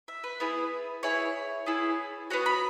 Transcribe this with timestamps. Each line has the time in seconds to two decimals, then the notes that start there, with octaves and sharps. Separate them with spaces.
0.08 E5
0.24 B4
0.40 B3 E4 G#4
1.03 B3 E4 G#4 C#5
1.66 B3 E4 G#4
2.30 B3 F#4 C#5
2.46 B5